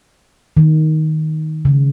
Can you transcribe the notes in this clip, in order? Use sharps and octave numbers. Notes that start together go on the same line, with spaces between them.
D#3
C#3